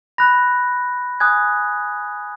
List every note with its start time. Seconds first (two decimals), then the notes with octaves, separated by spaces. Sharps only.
0.18 B5 F#6 A#6
1.20 G#5 D#6 F#6 G#6